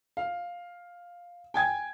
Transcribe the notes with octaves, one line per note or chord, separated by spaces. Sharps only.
F5
G5 G#5 G#6